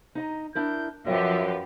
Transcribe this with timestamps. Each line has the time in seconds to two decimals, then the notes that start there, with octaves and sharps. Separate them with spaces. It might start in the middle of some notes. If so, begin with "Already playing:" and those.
0.15 D#4 D#5 A#5
0.55 D4 E4 A#4 G6
1.07 F#2 F3 G4 B4 D#5 E5 F#5